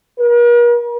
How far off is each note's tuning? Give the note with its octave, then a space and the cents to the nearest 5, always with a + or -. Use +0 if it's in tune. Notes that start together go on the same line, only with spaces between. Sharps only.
A#4 +45